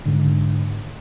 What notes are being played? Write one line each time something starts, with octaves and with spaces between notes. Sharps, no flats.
G#2 D3